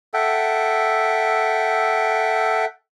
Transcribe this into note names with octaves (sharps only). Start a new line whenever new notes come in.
A4 E5 F#5 G5